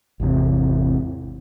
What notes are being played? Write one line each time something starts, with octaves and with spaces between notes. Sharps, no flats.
G#1 E2 C3